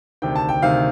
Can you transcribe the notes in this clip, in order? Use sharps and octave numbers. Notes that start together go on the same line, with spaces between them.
D2 C3 D#3 G5
A5
G5
D2 C3 D#3 F5